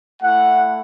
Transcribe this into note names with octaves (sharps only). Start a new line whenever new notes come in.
A3 E4 F#5